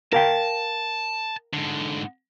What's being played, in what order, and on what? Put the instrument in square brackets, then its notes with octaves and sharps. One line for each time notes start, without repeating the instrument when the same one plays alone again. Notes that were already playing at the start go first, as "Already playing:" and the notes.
[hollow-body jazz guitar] A#4 F5 G5 [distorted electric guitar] A5
[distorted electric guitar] G#2 D3